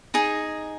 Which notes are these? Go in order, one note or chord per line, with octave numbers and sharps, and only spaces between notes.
D#4 G#4